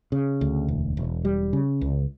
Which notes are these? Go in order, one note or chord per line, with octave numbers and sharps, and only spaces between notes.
C#3
D2
E1
E1
G3
C#3
C#2